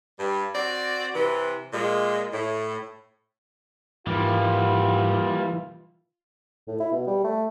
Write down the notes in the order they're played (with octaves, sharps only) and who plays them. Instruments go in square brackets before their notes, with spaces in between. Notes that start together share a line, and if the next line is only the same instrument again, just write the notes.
[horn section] G2 G3
C4 F#4 D5
C3 E3
A#2 G#3
A2
[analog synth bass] G#2 [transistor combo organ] E3 [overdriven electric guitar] G3 A#3 [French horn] F4
[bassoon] A2
E4
B2
G3
A3